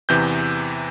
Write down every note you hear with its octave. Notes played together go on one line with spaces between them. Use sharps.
E2 C3 E3 G6